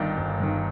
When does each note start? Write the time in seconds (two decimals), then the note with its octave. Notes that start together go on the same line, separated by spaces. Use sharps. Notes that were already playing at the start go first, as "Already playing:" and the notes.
Already playing: G1 G2 D#3 D4 D5
0.17 G1
0.40 G2 D#3